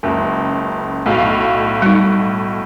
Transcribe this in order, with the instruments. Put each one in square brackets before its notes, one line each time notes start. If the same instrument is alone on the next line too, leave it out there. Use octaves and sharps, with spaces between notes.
[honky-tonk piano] F#1 C#2
B1 A2 F5
[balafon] G3 D#4